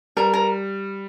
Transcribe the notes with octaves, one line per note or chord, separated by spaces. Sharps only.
G3 A#4
A#4